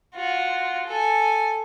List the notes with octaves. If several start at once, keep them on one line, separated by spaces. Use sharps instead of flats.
F4 F#4
A4 G#5